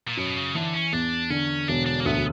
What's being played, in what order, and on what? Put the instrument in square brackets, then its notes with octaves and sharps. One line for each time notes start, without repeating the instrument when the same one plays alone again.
[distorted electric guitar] A#2
[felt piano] F#2 [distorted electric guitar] B2
[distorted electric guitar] C#3
[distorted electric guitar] D3 [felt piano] E3
[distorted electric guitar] C#4
[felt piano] E2 [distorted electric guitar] D4
[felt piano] D3 [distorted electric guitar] C#4
[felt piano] E1 [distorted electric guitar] D4
[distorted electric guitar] D4
A#3
[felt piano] D2 [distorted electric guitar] B3